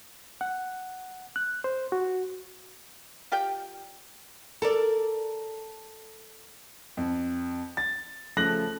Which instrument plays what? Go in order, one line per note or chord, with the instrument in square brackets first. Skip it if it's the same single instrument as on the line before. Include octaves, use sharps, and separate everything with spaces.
[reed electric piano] F#5
F#6
C5
F#4
[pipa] F4 G4 D5 G5
[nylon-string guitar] A4 A#4 D5
[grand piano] F2
A6
C#3 F3 A3 F#6 A#6 F#7